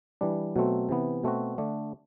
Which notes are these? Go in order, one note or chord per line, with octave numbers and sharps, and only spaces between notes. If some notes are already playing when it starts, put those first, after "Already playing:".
E3 G3 D4
B2 F#3 A3 C4
C3 E3 B3
B2 A3 C4 F#4
D3 A3 D4